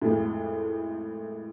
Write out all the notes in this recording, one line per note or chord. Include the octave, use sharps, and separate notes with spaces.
G#1 F2 A2